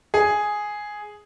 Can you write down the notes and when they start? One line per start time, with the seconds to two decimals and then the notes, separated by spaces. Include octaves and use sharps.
0.14 G#4